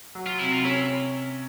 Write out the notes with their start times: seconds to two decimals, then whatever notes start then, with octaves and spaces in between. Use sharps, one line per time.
0.15 F#3
0.27 F4
0.39 C3 E4
0.52 F4
0.64 C#4 E4